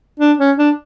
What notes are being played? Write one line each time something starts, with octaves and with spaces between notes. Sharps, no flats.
D4
C#4
D4